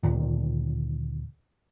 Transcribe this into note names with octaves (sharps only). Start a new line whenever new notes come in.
D2 A#2 D#3